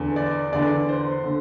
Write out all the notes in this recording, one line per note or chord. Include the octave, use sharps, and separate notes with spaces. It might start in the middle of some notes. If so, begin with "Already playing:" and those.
Already playing: E2 D3
D5
E2 D3 D5
C5
D3